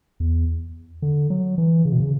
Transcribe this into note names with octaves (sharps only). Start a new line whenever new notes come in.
E2
D3
F#3
E3
C#3
B2
C#3